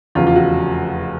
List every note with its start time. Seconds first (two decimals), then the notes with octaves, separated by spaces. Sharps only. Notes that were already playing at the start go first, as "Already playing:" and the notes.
0.15 F1 E2 C#3 F4
0.27 F4
0.36 F#4